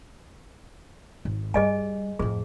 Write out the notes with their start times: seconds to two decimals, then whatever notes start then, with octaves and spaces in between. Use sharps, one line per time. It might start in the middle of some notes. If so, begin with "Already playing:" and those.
1.25 G#1
1.54 G2 G3 G#4 D#5 G#5
2.19 F2 A2 G#4